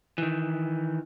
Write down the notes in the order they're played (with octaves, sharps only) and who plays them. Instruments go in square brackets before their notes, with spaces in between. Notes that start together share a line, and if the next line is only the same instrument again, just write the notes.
[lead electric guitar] D#3 E3